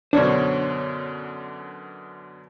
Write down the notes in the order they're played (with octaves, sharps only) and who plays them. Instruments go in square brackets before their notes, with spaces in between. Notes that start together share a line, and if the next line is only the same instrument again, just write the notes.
[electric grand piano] F#2 B2 D3 [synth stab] D4 [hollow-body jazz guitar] C5 C#5